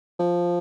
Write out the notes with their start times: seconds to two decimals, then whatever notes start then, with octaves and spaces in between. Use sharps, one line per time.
0.19 F3